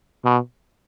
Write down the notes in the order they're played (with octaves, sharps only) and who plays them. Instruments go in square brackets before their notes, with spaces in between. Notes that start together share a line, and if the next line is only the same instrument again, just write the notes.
[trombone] B2